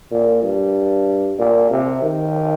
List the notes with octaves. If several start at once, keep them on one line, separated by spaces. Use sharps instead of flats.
A#2
G2
A#2
C3
D#3